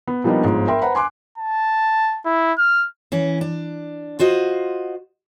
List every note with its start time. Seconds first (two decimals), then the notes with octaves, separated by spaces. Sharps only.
0.07 B3
0.24 F3 G3 A#3 B3 D4 D#4
0.44 G1 G#2 F3
0.67 A#4 E5 G5 B5 C6
0.82 B4 C5 F#5 A#5 B5
0.95 G#5 C6 D6 F#6
1.38 A5
2.26 E4
2.58 F6
3.12 E3 C#4
3.41 D4
4.19 F4 F#4 C5 D#5